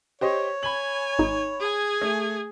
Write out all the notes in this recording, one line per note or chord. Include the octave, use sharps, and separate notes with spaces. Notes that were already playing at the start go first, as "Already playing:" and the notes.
G4 C5 C#5 D#5
G#5 B5 F#7
G#1 D#4
G#4 G#5
A3